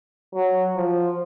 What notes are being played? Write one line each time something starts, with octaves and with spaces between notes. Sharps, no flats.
F#3
F3